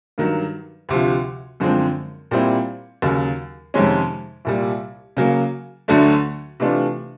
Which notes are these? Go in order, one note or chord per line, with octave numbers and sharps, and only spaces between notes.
G2 D#3 F#3
D2 C3 F3
F#2 D3 F3 G#3 C4
A#2 G3 C4 E4
D#2 C#3 F#3
F2 C3 D#3 G#3 C#4
C2 A#2 G3
C#3 F#3 A#3
D2 D3 F#3 A3 D4
C3 E3 A3 D4 F4